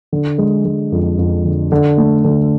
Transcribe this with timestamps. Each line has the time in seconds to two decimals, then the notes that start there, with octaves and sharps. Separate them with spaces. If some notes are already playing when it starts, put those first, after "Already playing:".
0.13 D3
0.38 G#3
0.65 G#3
0.92 F2
1.18 F2
1.45 D3
1.72 D3
1.98 A3
2.24 D3